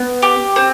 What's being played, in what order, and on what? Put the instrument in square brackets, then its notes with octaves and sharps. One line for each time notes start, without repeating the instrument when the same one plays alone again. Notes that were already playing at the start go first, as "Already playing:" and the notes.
Already playing: [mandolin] B3
G4
C4